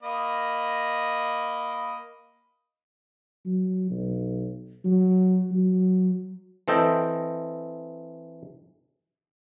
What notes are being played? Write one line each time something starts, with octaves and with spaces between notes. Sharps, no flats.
A#3 D#5 B5
F#3
B1
F#3
F#3
E3 C4 A4 D#5 G5